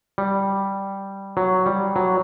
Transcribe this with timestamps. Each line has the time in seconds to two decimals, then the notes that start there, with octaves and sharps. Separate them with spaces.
0.18 G3
1.37 F#3
1.66 G3
1.96 F#3